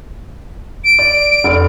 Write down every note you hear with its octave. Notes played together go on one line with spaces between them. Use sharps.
D7
D5
F1